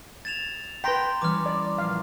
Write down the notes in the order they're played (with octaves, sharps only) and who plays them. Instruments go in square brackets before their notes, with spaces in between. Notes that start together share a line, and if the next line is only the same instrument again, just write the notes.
[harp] G#6 [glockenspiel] A6 E7 F7
[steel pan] B4 G5 [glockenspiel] A#5 C6 A#6
[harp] E3 G3 C#4 [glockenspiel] D6 F6
[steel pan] D5
[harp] A#1 [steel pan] F5